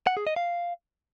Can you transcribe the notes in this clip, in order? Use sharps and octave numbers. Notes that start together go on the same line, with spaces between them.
F#5
G#4
D#5
F5